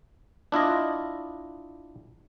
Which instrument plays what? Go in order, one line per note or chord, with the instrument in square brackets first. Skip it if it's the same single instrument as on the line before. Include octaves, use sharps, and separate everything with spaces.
[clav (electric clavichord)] D4 E4 F4 D#5